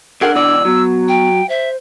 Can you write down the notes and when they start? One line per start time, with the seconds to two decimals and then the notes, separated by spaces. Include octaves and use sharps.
0.21 D3 D4 G#4 A#4 F#5
0.35 B2 E3 D5 E6
0.65 F#3 B3
1.08 G5
1.49 C5 E5